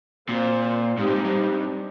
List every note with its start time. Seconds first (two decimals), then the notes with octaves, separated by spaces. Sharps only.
0.29 A#2 C4 F4 C5
0.98 G#2 C4 D#4 G4
1.06 G2
1.15 G#2
1.24 G2